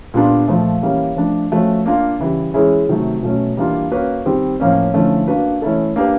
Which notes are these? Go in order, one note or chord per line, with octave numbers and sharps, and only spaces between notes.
A#2 G3 B3 D4 F4
A#2 F3 A3
E3 G3 A#3 C#4
F3 A3 D4
F3 A3 C#4 F#4
A#3 D4 F4
C#3 E3 G3
E3 G#3 C#4 E4 G#4
C3 D#3 F#3 A3
B2 F#3 A3 C#4
E3 G3 A#3 D4 F4
A#3 C#4 F#4 B4
D#3 G3 C4
A2 F3 A#3 C#4
D3 F3 A3 C#4 E4
A#3 D4 F#4 B4
E3 A3 C#4 E4 A4
A#3 D4 G4 B4